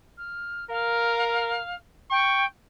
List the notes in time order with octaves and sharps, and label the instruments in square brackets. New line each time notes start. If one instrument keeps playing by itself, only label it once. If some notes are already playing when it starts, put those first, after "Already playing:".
[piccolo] F6
[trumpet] A#4 [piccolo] F5
[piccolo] G5 [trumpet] C#6